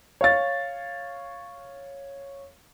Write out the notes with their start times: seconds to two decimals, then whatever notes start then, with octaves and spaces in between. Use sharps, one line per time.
0.21 C#5 F5 A6